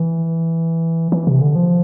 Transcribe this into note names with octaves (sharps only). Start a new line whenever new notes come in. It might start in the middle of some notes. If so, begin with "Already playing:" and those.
Already playing: E3
E3
C3
D3
F3